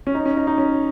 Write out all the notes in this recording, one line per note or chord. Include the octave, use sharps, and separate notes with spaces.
C#4
D#4
C#4
D#4
D#4
C#4